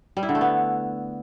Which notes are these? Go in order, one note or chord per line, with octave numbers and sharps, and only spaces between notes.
G3
E4
D3
A3
B3